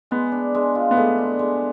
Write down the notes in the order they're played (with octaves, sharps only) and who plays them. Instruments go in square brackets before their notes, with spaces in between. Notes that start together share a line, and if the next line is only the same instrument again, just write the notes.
[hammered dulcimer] G#3 [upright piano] B3
[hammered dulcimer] D4
G#3
F4
[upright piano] B3
[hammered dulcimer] G#3 [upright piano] A3
[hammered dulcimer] D4
G#3